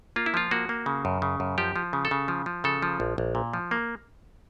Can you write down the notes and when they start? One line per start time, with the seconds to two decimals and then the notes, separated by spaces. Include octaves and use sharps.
0.16 A#3 F4
0.26 E4
0.34 F3 F4
0.51 A#3 F#4
0.69 A#3
0.86 C#3
1.05 F#2
1.22 C#3
1.40 F#2
1.58 F3 G4
1.76 F3
1.93 C#3
2.05 A4
2.11 C#3
2.28 F3
2.46 F3
2.64 C#3 A4
2.82 F3
3.00 A#1
3.18 A#1
3.35 A#2
3.54 F3
3.71 A#3